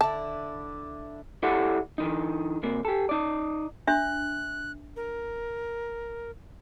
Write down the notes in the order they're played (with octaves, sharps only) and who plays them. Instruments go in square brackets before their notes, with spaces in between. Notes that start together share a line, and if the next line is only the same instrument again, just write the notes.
[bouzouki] D3 D4 E4 [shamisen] A5
[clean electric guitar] E4 G4 A4 D5 E5 F#5
D3 E3 D#4
C3 A#3
G4 A4
D#4 D5
[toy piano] D4 E5 [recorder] F#6
[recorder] A#4